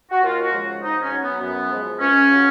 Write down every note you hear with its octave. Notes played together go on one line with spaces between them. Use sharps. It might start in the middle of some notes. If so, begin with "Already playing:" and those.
F#4
D#2 F4
F#4
C#3 F3 G#3
F#4
G#2 D#4
C#4
F#3
B3
F#2 B3
F3 G#3
C#2 C#4
C#3 F#3